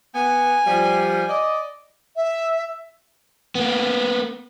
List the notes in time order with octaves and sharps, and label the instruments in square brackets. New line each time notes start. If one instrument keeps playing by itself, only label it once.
[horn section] B3 [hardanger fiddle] G#5
[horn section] F3 G3
D5 D#5
[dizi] E5
[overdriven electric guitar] A#3 B3